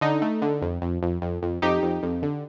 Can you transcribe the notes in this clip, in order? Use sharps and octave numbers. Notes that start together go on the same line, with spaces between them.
D3 D#4
A3
D3
F2
F2
F2
F2
F2
F2 D#4 G4
F2
F2
D3